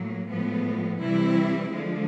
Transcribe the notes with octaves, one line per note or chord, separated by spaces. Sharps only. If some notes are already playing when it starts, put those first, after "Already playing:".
Already playing: A2 F#3 A#3
A2 F3 G#3 B3
C3 E3 G3 C4 E4
D3 F3 G#3